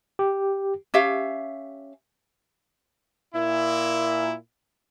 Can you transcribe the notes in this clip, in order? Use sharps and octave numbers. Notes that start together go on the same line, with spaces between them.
G4
C#4 G4 E5 F5
A#2 E4